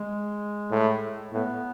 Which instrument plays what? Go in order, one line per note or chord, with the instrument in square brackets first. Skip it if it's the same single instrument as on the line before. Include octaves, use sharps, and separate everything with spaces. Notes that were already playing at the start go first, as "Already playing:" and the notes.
Already playing: [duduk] G#3
[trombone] A2
[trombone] A2 [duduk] B3